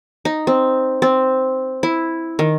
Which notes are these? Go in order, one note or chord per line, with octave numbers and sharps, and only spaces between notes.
D#4
C4
C4
E4
D#3